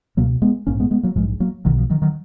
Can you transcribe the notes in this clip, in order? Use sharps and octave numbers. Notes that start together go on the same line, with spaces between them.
C#2 B2 F#3 A#3
G#3 B3
A#1 G#2 A#3 C#4
G#3 B3
G#3 B3
F#3 A#3
A#1 G#2 F3 G#3
F#3 A#3
B1 B2 D#3 F#3
F3
D#3 F#3
D#3 F#3